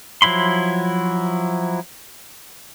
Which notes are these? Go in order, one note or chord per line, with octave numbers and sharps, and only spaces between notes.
F3 F#3 E4 B5 C6